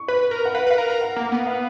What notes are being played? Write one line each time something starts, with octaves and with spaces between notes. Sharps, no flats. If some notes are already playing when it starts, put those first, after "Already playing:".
Already playing: C#6
B4 B5
A#4
F#5
B4 F5
B4
F5
A#4
A#4
F#5
A#3
B3
F5